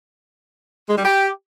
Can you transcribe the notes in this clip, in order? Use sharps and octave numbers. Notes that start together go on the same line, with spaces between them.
G#3
G3
G4